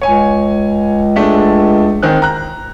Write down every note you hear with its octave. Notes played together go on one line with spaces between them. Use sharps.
C#2 C#5 G#5
G#3 A3 D4
D#3 C4 F#6
A#5 F#6